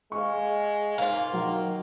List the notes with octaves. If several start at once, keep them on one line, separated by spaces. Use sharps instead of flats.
G#3 F5 C#6
G#2 A#3 F4
D#3 F#3